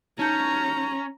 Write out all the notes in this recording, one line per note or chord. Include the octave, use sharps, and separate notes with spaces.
C#4 D#4 A5 A#5 G6